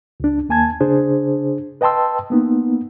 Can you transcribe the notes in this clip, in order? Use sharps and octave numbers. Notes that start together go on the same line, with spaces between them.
C#2 D4
D#2 A#3 G#5 A5 G#6
C#3 D4 G#4 C5
B4 D#5 G5 A5 C6 E6
A#3 B3 D#4